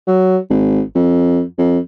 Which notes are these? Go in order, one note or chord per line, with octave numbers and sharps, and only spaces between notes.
F#3
G#1
F2
F2